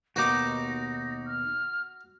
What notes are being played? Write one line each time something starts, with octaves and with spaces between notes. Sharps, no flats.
D#2 B2 D#4 F#4 D6 A#6
F6